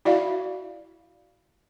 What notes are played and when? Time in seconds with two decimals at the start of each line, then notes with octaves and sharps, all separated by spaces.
0.05 E4 F#4 D5 E5 F5